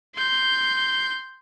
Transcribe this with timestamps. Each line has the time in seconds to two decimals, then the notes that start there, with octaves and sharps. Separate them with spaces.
0.15 C6 G6